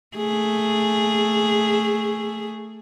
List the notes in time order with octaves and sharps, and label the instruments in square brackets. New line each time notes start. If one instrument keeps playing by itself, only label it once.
[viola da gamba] A3 G#4